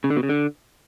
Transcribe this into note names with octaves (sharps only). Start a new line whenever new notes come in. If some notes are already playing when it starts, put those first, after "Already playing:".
C#3
D3
B2
C#3
D3